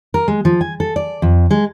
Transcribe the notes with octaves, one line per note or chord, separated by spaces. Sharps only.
A#4
G#3
F3
G#5
A4
D5
F2
G#3